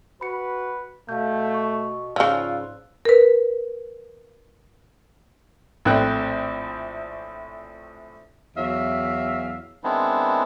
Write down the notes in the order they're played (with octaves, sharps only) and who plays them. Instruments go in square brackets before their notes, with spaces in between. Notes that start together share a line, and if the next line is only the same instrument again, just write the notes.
[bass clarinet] F#4 [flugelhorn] B4 [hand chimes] B5 C#7
[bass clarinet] B2 [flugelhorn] A3 [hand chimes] F5 G6
[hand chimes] C#6
[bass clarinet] G#2 [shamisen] C#3 F3 [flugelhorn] F4 [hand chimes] D5 E6 F#6
[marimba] A#4 B4
[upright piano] A#1 A2 C4 C5 F#6
[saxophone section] E2 F#3 E5 F5
[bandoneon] D#3 G#3 B3 C4 D4 E4